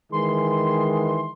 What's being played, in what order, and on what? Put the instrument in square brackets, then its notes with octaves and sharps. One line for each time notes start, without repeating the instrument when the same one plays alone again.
[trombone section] D#3 E3 G#3 [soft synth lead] C6